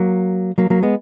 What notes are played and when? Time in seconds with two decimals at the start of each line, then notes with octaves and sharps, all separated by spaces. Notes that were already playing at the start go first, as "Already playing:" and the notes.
Already playing: F#3 A#3
0.58 F#3 A#3
0.70 F#3 A#3
0.83 G#3 B3